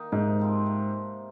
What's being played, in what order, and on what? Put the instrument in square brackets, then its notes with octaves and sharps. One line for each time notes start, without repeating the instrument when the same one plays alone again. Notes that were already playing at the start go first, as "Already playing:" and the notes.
Already playing: [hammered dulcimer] D#3 A#3 D#4
[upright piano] G#2 [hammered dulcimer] C3
[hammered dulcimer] F3 C4 F4
C3